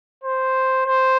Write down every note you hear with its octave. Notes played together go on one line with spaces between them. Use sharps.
C5
C5